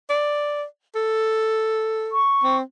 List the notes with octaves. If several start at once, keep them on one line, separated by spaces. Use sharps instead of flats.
D5
A4
C#6
C4